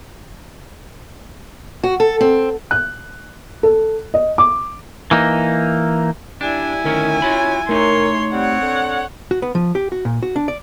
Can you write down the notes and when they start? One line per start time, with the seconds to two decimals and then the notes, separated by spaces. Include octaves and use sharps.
1.84 F#4
2.00 A4
2.21 C4
2.71 F#6
3.63 A4
4.14 D#5
4.38 D6
5.11 E3 A#3 D#4
6.41 G3 D4 E4 G#5
6.84 D2 D#3 C#4 A#4
7.22 C#4 F4 F#4 B5
7.69 A3 D#4 A#4 C#5 C6
8.32 G3 C4 C#5 F#5
8.62 D3
9.31 F#4
9.42 B3
9.55 F3
9.75 G4
9.92 F#4
10.05 A#2
10.23 F#4
10.36 D4
10.48 D5